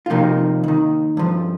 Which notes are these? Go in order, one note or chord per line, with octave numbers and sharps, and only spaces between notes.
F4
C2 C3 F3 A#3 D#4
D#2 D#3
G2 F3